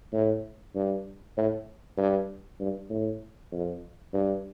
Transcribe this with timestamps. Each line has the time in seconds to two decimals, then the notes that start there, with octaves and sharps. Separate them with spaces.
0.13 A2
0.75 G2
1.37 A2
1.97 G2
2.60 G2
2.90 A2
3.52 F2
4.14 G2